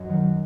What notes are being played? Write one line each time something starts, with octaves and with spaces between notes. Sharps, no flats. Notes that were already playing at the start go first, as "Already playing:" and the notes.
Already playing: F#2 C#5 D#5
D#3 F#3